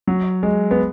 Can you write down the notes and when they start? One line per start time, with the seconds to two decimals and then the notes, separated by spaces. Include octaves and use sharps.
0.08 F#3
0.43 G#3
0.71 B3